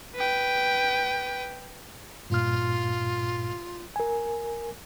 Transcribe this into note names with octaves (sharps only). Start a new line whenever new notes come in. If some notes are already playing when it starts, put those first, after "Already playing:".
B4 G5
G2 A#2 F4 F6
A#4 G#5